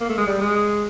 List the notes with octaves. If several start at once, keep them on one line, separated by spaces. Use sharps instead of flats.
A#3
A3
G#3
G3
G#3